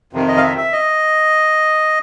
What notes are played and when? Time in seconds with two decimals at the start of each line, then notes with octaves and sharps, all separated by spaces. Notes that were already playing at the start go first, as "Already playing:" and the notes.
0.13 F2 C3 D#3
0.28 D#5
0.37 F5
0.43 E5
0.58 E5
0.73 D#5